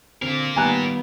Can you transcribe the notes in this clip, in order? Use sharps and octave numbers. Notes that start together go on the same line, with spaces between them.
D3 C4 F4 A#4
D#3 G3 B3 G5 G#5 A#5 F#6